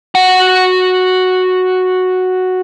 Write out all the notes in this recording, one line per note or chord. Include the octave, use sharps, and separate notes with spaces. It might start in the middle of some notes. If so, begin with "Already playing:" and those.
F#4 F#5